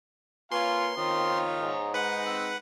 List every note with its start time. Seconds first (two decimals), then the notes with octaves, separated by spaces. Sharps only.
0.52 A#3 F4 B4 C#5 F5 G#5 C6
0.98 D#3 C4 F4 C#5 A#5 D#6
1.61 G#2
1.94 G#3 D#4 B4 F#5
2.26 C4 E6